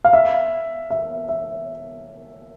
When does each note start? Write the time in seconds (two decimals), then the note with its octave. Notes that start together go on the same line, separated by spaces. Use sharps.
0.04 F5
0.13 E5
0.90 E5
1.29 E5